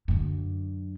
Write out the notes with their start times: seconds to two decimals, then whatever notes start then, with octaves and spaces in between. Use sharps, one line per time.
0.08 F#2 D3